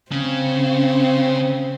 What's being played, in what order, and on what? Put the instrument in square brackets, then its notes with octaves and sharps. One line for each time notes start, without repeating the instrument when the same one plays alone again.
[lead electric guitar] C#3 [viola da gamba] C4